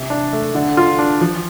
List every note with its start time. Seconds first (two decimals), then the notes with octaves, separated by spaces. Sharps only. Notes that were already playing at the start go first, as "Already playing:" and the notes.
Already playing: C3
0.10 D4
0.33 A3
0.55 D3
0.77 F4
0.99 D4
1.21 F3